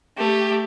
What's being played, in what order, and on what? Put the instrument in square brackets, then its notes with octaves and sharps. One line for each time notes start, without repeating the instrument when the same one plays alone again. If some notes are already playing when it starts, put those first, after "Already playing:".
[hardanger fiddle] A3 [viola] G4